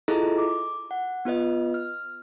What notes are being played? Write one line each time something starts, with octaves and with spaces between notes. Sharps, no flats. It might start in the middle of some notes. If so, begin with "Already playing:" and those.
E4 F4 G#4 A4 D#5 A#5
D6
F#5
B3 F4 B4 D#5
F6